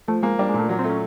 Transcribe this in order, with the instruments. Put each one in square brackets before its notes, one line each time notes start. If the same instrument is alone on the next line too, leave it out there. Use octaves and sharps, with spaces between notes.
[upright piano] F3 [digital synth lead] A3
[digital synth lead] G#3 [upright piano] A#3
[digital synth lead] G3 [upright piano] D4
[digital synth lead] G#3
[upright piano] A#2
[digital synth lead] A3
[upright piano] F#3
[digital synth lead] C4
[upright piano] A3
[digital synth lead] C#4